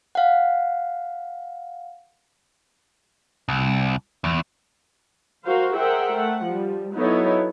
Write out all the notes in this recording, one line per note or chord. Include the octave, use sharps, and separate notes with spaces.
F5 F#5
C2
E2
F#4 A#4 C5 F5
G#4 A#4 C5 E5 F#5 G5
A3 F#5
F3 G3
F#3 B3 D#4 E4 A4 C#5